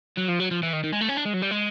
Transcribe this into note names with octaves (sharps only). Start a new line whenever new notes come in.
F#3
F3
F#3
F3
E3
D#3
D#3
G#3
A3
C#4
D4
G#3
F#3
G3
G#3